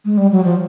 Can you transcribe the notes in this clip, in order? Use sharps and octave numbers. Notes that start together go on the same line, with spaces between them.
G#3
G3
F#3
F3